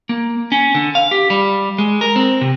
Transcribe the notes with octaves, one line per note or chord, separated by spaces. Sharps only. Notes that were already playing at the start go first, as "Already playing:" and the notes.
A#3
C#4
D3
F5
G4
G3
G#3
A#4
C4
C3